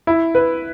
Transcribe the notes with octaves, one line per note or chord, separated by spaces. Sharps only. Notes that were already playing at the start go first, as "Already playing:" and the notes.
E4
B4